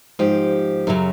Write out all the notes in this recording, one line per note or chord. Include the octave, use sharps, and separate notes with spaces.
G#2 F3 G4
F#2 C#3 F#3